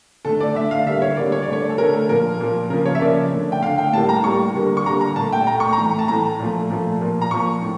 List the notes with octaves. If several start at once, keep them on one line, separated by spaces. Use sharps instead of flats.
D3 A3 A4
D5
D3 A3 E5
F5
D3 G3 A#3 E5
C#5
D3 G3 A#3 D5
C#5
D5
D3 A3 C#5
A4
D3 A3 A#4
A4
A#2 F3 A#3 A#4
A#2 F3 A#3
C#3 F3 A#3 A#4
C#5
E5
C#3 F3 A#3 D5
D3 A3
G5
D3 A3 F5
G5
A2 G3 A#3 A5
A#5
A2 G3 A#3 C#6
D3 G3 A#3
C#6
D3 G3 A#3 A#5
A#5
A#2 A3 A5
G5
A#2 A3 A#5
C#6
A#5
A2 E3 A3
A5
A2 E3 A3 A#5
A#2 F3 A3
A#2 F3 A3
A#2 F3 A#3
A#5
A#2 F3 A#3 C#6
A2